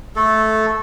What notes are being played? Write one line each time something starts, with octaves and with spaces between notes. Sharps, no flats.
A3 A4